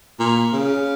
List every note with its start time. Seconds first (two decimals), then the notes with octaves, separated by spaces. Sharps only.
0.20 A#2
0.53 C#3